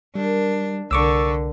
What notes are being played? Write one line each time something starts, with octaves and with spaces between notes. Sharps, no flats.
D#3 G3 D4
C2 D3 A#3 C#6 D6 E6